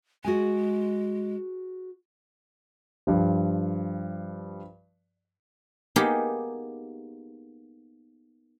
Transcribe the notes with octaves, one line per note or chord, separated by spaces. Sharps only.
G#3 F#4 G#4 G#5
G2 F3
A#3 B3 D#4 G4 G#4 A#4